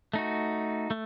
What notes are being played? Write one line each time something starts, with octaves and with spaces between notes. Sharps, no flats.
A3 D#4 F#4
A3